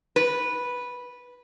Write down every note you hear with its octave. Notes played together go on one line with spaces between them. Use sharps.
B4